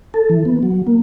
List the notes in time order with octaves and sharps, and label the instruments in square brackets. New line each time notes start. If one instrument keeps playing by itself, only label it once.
[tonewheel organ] A4
E3
B3
F#3
A#3